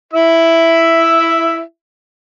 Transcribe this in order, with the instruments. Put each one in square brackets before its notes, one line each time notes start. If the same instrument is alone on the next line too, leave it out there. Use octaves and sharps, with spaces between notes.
[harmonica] E4 E5